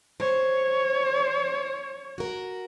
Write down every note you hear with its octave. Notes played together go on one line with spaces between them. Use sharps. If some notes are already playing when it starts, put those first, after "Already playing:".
C5 C#5
F#4 A#4